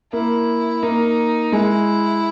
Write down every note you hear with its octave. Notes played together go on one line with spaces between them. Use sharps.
A#3 E4
A#3 D#4
G#3 E4